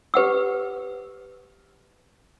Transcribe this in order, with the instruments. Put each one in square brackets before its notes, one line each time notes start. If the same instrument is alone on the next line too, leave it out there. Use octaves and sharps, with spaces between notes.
[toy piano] G4 B4 F#5 E6